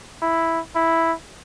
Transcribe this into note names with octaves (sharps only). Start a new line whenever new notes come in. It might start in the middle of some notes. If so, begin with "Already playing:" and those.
E4
E4